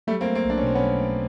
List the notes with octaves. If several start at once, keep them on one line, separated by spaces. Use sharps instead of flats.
F#3 G3 A3
A#3 C4
A3
A#3 C4
B1 D4
C#4
B2 C4
B3 C#4
F#3
A3